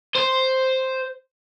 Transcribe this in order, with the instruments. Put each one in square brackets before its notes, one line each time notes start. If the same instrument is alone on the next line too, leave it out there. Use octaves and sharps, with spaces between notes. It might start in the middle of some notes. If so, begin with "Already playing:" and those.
[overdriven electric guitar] C5